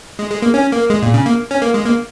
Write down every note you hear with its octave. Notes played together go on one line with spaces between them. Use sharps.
G#3
G#3
A#3
C#4
A#3
G#3
A#2
C#3
A#3
C#4
A#3
G#3
A#3